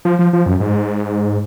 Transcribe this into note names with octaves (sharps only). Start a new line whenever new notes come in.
F3
F3
F3
F#2
G#2